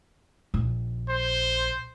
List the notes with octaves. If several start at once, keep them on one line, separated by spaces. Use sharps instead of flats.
A#1
C5